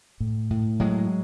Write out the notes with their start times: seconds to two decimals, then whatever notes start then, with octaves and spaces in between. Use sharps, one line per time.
0.20 A2
0.50 A2
0.80 A2 F#3 G#3